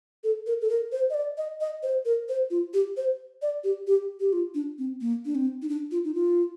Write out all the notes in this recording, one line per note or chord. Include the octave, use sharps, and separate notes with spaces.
A4
A#4
A4
A#4
C5
D#5
D5
D#5
D#5
C5
A#4
C5
F4
G4
C5
D5
G4
G4
G4
F4
D4
C4
A#3
D4
C4
D#4
D4
F4
D#4
F4